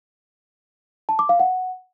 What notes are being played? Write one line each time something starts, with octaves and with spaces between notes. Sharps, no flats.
A5
D6
F5
F#5